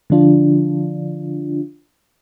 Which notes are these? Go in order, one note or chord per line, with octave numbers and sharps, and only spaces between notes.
D3 F3 D4 F4